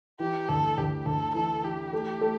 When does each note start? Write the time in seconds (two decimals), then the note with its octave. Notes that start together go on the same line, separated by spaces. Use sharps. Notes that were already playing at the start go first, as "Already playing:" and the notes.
0.20 E3 G4
0.48 D2 A4
0.78 D2 G4
1.06 D2 A4
1.34 E3 A4
1.63 E3 G4
1.93 A3
2.21 A3